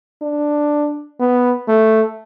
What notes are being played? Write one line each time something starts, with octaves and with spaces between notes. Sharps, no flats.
D4
B3
A3